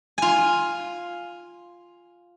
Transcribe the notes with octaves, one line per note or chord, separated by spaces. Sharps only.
F4 G#5